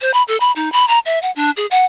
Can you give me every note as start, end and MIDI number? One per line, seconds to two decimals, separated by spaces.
0.01 0.11 72
0.14 0.23 83
0.28 0.37 69
0.40 0.52 83
0.56 0.72 63
0.72 0.87 83
0.88 0.99 82
1.06 1.21 76
1.22 1.31 78
1.36 1.51 62
1.57 1.66 68
1.71 1.85 78